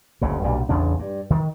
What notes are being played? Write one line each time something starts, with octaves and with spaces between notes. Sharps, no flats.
F#1 D2 C#3
B1 G2 A#2 G3
A1 E2 C#3 D4
G2
D#3